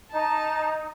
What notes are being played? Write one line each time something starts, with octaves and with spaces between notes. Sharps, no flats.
D#4 A5